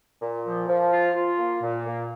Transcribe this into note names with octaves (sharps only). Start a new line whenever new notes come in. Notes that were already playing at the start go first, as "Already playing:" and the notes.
A#2
F3
F3
F4
F4
A#3
A#2
A#3